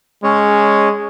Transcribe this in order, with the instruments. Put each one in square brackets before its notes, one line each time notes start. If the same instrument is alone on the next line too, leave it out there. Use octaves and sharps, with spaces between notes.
[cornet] G#3 [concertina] C#4 C#5